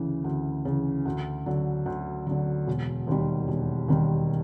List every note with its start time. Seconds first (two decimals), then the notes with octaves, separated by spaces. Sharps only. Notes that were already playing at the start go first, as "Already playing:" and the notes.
Already playing: D2 C#3 E3
0.24 D2
0.65 C#3 E3
1.05 D2
1.46 D3 F#3
1.86 D2
2.27 D3 F#3
2.67 E1
3.07 D#2 D#3 G3
3.48 E1
3.88 D#2 D#3 G3